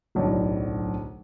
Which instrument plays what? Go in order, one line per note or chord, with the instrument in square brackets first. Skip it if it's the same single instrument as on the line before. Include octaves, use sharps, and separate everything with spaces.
[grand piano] D1 B1 D4